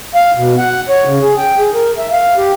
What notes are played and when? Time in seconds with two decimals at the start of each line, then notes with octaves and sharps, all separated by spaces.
0.15 F5
0.36 B2
0.58 F#5
0.89 C#5
1.05 C#3
1.21 G#4
1.38 G5
1.58 G#4
1.74 A#4
1.98 E5
2.12 F5
2.37 G4